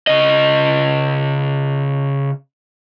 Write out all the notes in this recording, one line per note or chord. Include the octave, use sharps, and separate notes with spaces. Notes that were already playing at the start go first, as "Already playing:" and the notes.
C#3 D#5